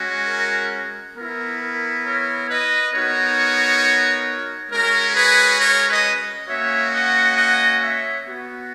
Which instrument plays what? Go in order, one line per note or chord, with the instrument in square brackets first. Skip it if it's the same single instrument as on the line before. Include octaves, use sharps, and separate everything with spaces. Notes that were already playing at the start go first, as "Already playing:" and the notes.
Already playing: [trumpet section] G#3 C#4 F#4
A#4
B3 E4 A#4
A#4
A#4 C#5
B4 D#5
B3 D#4 F#4 A#4 C#5
G#3 C#4 F#4 A#4
G#4 B4
A#4 C#5
B4 D#5
A#3 C#4 F#4 C#5 E5
D#5 F#5
D#5 F#5
C#5 E5
B3 F#4